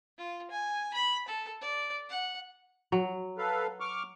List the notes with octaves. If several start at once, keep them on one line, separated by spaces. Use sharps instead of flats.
F4
G#5
B5
A4
D5
F#5
F#3
A4 B4 F5
C#6 D6 F6